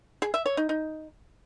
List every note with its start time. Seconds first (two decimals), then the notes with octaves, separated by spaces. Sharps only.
0.22 G#4
0.34 E5
0.46 C#5
0.57 D#4
0.69 D#4